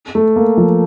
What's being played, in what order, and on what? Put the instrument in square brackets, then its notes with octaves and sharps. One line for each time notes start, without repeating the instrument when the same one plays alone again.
[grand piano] A3
A#3
F3